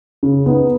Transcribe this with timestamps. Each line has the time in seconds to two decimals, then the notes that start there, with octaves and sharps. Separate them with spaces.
0.23 C#3
0.46 B3 D#4